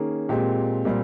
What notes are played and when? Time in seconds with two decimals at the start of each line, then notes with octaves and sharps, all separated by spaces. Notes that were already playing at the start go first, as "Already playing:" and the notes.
Already playing: D#3 A#3 C#4 G#4
0.29 A#2 G#3 C4 G4
0.85 A#2 G3 C4